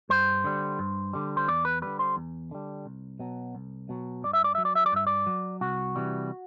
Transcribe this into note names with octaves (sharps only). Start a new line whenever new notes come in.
G2 C5
D3 G3
G2
D3 G3
C5
E2 D5
B4
D3 G3 B4
C5
E2
D3 G3
C2
B2 F#3
C2
B2 F#3
G2 D5
E5
D5
F#3 E5
D5
E5
D5
G2 E5
D5
F#3
C2 F#4
C3 E3 G3